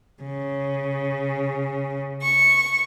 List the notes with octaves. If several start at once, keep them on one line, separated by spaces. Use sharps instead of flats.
C#3
C#6